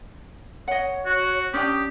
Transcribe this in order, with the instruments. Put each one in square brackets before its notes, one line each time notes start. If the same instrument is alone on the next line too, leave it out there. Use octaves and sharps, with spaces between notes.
[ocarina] C#5 [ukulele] D#5 F#5
[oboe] F#4
[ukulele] C#4 D4 G5 [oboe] G4 [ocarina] D#6